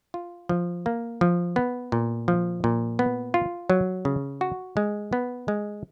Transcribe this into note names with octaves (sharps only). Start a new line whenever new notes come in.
F4
F3
A#3
F3
B3
A#2
F3
A#2
B3
F4
F#3
C#3
F#4
G#3
B3
G#3